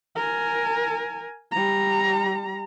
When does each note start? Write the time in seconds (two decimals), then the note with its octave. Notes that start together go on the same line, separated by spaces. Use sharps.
0.16 A#4 G#5
1.52 G3 A#5